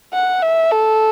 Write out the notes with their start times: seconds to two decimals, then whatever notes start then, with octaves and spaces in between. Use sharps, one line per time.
0.13 F#5
0.42 E5
0.72 A4